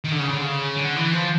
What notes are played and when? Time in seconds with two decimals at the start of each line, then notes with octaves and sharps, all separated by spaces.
0.04 D#3
0.12 D3
0.20 C#3
0.29 D3
0.41 C#3
0.77 D3
0.96 E3
1.13 F3